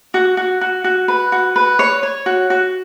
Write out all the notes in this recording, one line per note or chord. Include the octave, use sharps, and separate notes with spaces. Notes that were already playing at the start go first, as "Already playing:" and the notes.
F#4
F#4
F#4
F#4
B4
F#4
B4
C#5
C#5
F#4
F#4